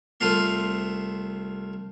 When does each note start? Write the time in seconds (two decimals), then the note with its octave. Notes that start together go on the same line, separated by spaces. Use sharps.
0.21 C2 A3 F4 C6